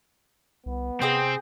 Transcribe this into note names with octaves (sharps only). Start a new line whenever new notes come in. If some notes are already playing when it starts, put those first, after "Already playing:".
C2 B3
C3 C4 G#4 D#5 G5